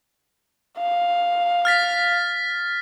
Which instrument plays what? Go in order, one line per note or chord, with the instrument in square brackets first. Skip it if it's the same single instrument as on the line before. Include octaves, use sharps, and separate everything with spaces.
[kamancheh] F5
[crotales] F6 A6 B6